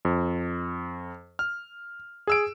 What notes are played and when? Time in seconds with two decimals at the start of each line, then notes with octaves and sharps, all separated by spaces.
0.05 F2
1.39 F6
2.27 G#4 E6 D7